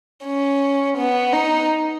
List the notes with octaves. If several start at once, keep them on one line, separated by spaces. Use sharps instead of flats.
C#4
B3
D#4